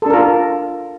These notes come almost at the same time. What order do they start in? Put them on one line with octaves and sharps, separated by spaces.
A4 D4 A#4 F4